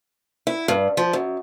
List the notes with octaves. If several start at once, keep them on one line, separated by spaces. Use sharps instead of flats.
E4
G2
F3
F#2